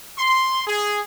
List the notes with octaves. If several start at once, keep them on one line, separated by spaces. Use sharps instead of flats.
C6
G#4